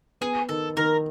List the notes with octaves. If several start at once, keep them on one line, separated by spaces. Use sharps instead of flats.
B3 G#4
D#3 A4
D#3 A#4